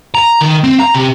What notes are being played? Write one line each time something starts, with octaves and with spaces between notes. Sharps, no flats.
A#5
D#3
C4
A#5
C3